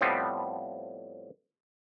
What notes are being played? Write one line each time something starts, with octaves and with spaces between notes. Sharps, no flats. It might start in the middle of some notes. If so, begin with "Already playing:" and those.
A2 F3 G3 B3 C4